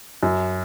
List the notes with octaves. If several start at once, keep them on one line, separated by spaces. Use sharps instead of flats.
F#2